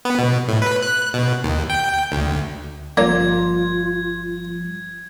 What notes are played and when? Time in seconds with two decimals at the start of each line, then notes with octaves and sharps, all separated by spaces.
0.05 B3
0.19 B2
0.48 A2
0.62 B4
0.83 F#6
1.13 B2
1.44 D#2
1.70 G5
2.12 D2
2.97 G1 F3 G3 A#3 D4 F4 G#6